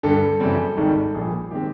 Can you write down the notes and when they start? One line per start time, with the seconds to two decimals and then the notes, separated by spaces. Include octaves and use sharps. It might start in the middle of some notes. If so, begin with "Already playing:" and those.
0.03 G2 D3 G3 A4
0.40 F#2 C#3 E3 G3 C4
0.77 G#1 G#2 D#3 G3
1.15 A#1 A#2 G3 G#4
1.51 D#3 G#3 C4 G4